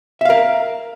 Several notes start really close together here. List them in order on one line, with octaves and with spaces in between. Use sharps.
E5 F5 A#4